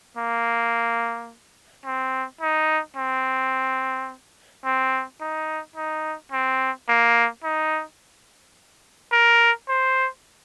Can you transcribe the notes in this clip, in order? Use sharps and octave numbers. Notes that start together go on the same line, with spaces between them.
A#3
C4
D#4
C4
C4
D#4
D#4
C4
A#3
D#4
A#4
C5